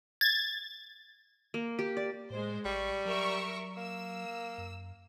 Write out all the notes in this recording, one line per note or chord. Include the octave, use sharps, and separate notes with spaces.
G#6 A6
A#3
G4
D5
A2 G#3 C5
A1 G3 C#6
F#3 A#4 E5 C#6
A#3 E6
F#2